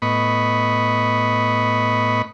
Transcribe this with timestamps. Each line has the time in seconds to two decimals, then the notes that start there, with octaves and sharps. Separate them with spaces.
0.02 A2 B3 D#5 B5 C#6